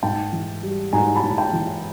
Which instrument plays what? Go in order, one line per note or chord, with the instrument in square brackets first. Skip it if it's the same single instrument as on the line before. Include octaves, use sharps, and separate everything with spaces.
[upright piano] G#2 G5 A5
E3
G3
G#2 G#5 A#5
A5 B5
G#2
G5 A5
E3